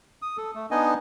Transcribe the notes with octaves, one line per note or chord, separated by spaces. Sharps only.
D#6
A4
A3
B3 D4 D#4 D#5 G#5